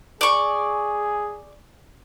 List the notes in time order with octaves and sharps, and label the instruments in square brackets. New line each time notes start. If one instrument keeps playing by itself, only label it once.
[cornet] G#4 [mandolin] D5 C#6